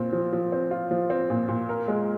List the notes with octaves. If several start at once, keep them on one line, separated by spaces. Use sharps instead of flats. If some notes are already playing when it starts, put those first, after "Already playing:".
Already playing: A#2 C4
F3
F3
C4
F4
F3
C4
A#2
A#2
A#4
G#3